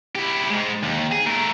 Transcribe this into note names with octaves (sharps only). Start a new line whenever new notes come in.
E4 G4
G#2 G#3
D#2
G#4
A3 A#4